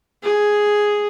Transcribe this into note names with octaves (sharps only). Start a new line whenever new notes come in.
G#4